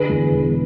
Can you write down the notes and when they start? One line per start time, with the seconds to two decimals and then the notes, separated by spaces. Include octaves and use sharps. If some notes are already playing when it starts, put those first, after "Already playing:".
Already playing: D3 G#4 B4
0.09 E2
0.31 E1